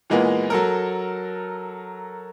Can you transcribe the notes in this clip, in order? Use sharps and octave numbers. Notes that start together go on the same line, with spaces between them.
A#2 E3 G#3 A#3 B3
F#3 A4 A#4